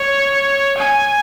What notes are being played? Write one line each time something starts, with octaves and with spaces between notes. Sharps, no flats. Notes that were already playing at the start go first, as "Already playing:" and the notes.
Already playing: C#5
G#5